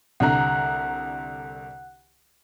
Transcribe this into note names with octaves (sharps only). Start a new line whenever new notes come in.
C2 D3 F#5 A#5 F#6